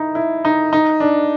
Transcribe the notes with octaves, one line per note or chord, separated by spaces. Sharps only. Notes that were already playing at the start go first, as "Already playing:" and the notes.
Already playing: D#4 E4
E4
D#4
D#4
D4